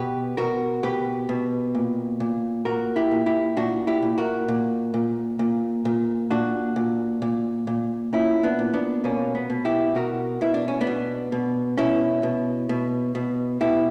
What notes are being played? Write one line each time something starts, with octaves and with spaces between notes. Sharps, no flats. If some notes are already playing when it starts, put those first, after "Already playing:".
Already playing: B2 G4 B4
B2 F#4 A#4
B2 G4 B4
B2
A#2
A#2
A#2 F#4 A#4
E4 G4
A#2
E4 G4
A#2 D4 F#4
E4 G4
A#2
F#4 A#4
A#2
A#2
A#2
A#2
A#2 D4 F#4
A#2
A#2
A#2
A#2 C#4 E4
B3 D4
A#2
B3 D4
B2 A#3 C#4
B3
B2
E4 G4
B2 F#4 A#4
B2 E4
D4
C#4
B3 D4
B2
B2
B2 C#4 E4
B2
B2
B2
B2 E4 G4